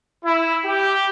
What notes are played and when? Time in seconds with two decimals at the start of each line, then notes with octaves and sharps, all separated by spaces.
0.24 E4
0.65 G4